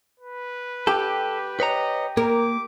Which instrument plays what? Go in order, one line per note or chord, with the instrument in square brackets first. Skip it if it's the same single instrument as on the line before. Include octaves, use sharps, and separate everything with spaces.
[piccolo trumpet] B4
[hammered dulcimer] G4 [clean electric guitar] A4
[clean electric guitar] B4 C#5 A#5 [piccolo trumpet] D#5
[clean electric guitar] A#3 [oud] A#4 [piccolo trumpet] D6